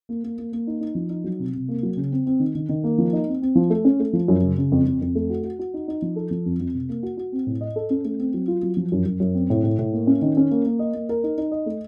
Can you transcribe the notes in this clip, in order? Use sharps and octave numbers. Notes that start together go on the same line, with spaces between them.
A#3
A#3
A#3
A#3
D#4
D#4
F3
D#4
F#3
C3
C3
A#3
F#3
C#3
C4
C4
D#3
D#3
D#3
A#3
F3
D#4
C4
C4
F3
A3
C#4
A3
F3
F#2
C#3
C#3
F2
F2
F2
A3
F#4
F#4
F#4
D#4
D#4
F3
A4
F3
F2
F2
C3
A#3
F#4
F#4
C4
A2
D#5
A4
C#4
A3
C4
F#3
F4
F#3
F3
F#2
F#2
F#2
C4
A2
A2
A2
A#3
C#4
D#3
C#4
A#3
A#3
D#5
A#3
A#4
D#4
D#4
D#5
A3